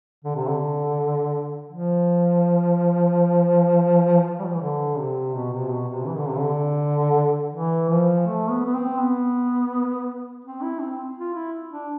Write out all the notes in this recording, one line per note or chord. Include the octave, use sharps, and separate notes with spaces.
D3
C3
D3
F3
G3
F3
E3
D3
C3
B2
C3
B2
C3
E3
D3
C3
D3
E3
F3
A3
B3
B3
C4
B3
C4
E4
C4
F4
E4
D4